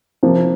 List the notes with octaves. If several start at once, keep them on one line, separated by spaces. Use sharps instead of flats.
C3 F3 A#3